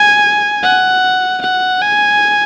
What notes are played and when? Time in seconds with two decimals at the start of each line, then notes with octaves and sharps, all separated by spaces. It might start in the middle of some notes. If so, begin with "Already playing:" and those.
Already playing: G#5
0.63 F#5
1.42 F#5
1.82 G#5